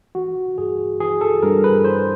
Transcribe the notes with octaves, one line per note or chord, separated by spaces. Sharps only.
E3 F#4
G2 G#4
E3 G#4
A4
G2 A#4
B4
E3 C5